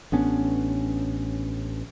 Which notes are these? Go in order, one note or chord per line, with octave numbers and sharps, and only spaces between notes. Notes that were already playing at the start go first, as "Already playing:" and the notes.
A1 B3 C#4 D4